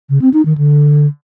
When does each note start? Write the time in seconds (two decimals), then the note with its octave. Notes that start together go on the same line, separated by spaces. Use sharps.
0.09 C#3
0.21 C4
0.33 D#4
0.45 D#3
0.57 D3